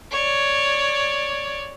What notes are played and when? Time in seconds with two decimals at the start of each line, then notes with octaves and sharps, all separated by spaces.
0.12 C#5 D5